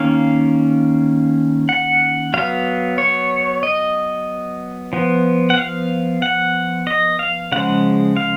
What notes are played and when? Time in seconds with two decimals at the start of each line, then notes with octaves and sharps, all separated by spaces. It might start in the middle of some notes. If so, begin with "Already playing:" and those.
Already playing: D#3 A#3 C#4 F5
1.69 F#5
2.34 F#3 B3 F5
2.98 C#5
3.63 D#5
4.93 F3 B3
5.50 F#5
5.58 F5
6.22 F#5
6.87 D#5
7.19 F5
7.52 C#3 F3 G#3 F#5
8.17 F5